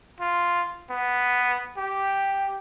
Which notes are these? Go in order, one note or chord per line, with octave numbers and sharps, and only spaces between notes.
F4
B3
G4